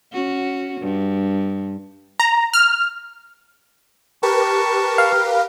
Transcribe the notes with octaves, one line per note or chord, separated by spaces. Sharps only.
C#4 F#4
G2
A#5
F6
G4 A#4 B4 A5 C#6
F5